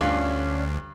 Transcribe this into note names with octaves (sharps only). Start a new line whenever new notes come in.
D2 G2 C#4 D4 F4